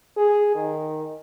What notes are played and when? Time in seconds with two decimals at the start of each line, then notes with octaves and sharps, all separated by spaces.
0.17 G#4
0.55 D#3